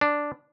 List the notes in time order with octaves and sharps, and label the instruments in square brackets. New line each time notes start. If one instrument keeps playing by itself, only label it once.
[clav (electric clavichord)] D4